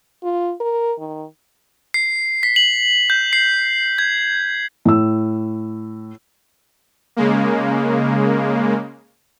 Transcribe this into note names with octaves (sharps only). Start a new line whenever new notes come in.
F4
A#4
D#3
C7
B6
F#7
G6
C7
G#6
A2 E6
C#3 G#3 A#3